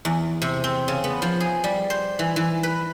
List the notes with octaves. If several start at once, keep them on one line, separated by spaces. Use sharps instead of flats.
E2
C3
C4
C#3
B3
F3
G#4
G3
C5
E3
E3
B4